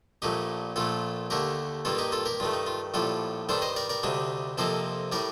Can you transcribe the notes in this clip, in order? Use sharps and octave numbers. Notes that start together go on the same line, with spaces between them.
A#1 A#2 A3 D#4 G4
A#1 A#2 A3 F4 A4
D#2 D3 A3 G4 A#4
G2 D#3 A#3 F4 A4
D#4 G4
F4 A4
G4 A#4
G2 D#3 A3 F4
D#4
F4
A#1 A2 G3 F4 A4
G2 D#3 G3 D4 A4 C5
C5 D#5
A#4 D5
A#4 D5
D2 C3 G3 D4 D#4
F2 C3 F3 A#3 D#4 A4 C5
A2 G3 A#4 D5